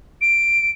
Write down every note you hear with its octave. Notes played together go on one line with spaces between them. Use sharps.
D7